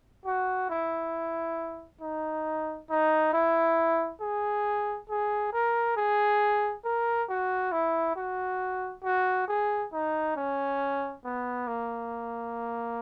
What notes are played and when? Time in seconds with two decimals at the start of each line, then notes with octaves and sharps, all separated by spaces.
0.26 F#4
0.69 E4
2.01 D#4
2.90 D#4
3.33 E4
4.21 G#4
5.09 G#4
5.53 A#4
5.97 G#4
6.84 A#4
7.29 F#4
7.72 E4
8.16 F#4
9.04 F#4
9.48 G#4
9.92 D#4
10.36 C#4
11.25 B3
11.67 A#3